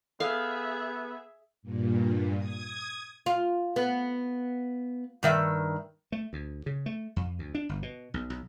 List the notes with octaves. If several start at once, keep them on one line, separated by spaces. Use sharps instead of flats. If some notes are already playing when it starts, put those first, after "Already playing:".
B3 G#4 A4 E5 F5
G2 A#2
D#6 G#6
F4
B3
G2 D#3 E5
A3
D2
C#3
A3
F2
D2
D4
G1
B2
B1
B1